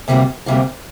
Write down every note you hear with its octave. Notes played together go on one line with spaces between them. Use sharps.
D2 C3 G3 A#3 F#4
D2 C3 G3 A#3 F#4